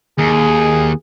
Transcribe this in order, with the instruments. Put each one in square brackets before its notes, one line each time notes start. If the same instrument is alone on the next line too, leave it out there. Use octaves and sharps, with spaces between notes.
[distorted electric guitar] D#2 [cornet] G#4